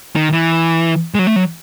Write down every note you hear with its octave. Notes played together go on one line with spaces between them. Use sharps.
D#3
E3
G#3
F#3
A3
F#3